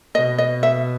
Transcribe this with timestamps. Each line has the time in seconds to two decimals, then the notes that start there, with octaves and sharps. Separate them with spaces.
0.15 B2 D#5
0.38 D#5
0.63 E5